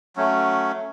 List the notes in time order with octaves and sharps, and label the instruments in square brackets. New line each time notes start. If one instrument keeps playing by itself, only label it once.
[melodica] F#3 A3 C#4